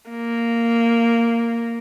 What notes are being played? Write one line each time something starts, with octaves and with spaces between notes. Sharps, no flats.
A#3